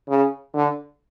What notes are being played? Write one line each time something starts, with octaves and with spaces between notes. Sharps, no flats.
C#3
D3